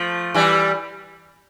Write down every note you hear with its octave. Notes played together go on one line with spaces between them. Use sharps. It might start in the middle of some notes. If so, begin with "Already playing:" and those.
Already playing: F3 A3
E3 G3